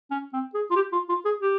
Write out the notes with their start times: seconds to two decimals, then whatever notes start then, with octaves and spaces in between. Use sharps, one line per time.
0.11 C#4
0.33 C4
0.54 G#4
0.71 F4
0.76 G4
0.93 F4
1.09 F4
1.25 G#4
1.41 G4